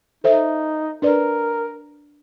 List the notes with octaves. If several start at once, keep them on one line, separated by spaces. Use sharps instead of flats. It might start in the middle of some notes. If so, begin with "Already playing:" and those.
D#4 A4 C5 E5
D4 A#4 B4 D5